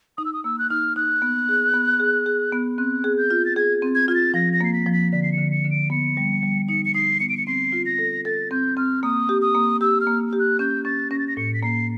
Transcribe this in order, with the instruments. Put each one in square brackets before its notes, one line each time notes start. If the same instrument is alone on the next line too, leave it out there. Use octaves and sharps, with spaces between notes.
[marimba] D#4 [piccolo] D#6
[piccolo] E6
D#6
[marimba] A#3 [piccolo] E6
[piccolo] F#6
[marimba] D#4 [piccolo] F6
[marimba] D#4 [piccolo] F#6
[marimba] B3
G#4
B3
G#4
G#4
B3
[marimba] C4 [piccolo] F#6
[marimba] G#4
[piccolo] G6
[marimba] F4
[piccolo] A6
[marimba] G#4 [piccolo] G#6
[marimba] C4
[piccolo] G#6
[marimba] F4 [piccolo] G#6
[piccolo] A6
[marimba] F3 [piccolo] A#6
[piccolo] A#6
[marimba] A#3 [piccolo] C7
[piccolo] B6
[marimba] F3
[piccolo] B6
[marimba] D3 [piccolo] B6
[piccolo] C7
C#7
[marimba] D3
[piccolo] C#7
[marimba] D3
[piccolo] D7
[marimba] B3 [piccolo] C#7
[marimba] G3
G3
[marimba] D#4 [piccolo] C#7
[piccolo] C#7
[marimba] D#4 [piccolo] C7
[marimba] B3 [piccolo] C#7
[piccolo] D7
C#7
[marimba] C4 [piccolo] C7
[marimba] F4
[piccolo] A#6
[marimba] A4
[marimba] A4 [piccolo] A6
[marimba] C4 [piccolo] G6
[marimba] C4 [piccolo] F6
[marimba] A#3 [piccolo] D#6
[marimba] G4
[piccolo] D#6
[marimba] A#3
[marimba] G4 [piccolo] E6
[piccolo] F6
[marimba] A#3
G4
[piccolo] F#6
[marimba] C#4 [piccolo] G6
[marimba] C#4 [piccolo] A6
[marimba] C#4 [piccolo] A#6
[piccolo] A6
A#6
[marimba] A2 [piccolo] C#7
[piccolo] B6
[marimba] A#3 [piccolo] C7